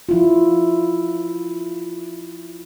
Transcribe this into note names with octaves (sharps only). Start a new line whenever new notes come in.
F3 E4 F4